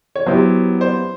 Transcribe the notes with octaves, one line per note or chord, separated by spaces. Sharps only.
C#5
F#3 B3 E4 G4 C5
C5